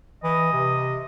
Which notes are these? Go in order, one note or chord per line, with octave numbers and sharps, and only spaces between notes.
E3 D#5
C3